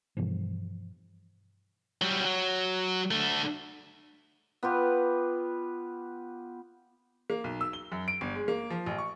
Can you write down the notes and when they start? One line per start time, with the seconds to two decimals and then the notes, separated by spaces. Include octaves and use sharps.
0.17 G2 B2 E3 F3
2.02 F#3 G3
2.25 F#3
3.11 D3 A3
4.63 B3 F4 G4 B4
7.30 A#3
7.44 B1
7.61 E6
7.73 G7
7.92 F#2
8.08 D7
8.21 G1
8.35 G#3
8.48 A#3
8.70 F3
8.86 A1
8.98 C#6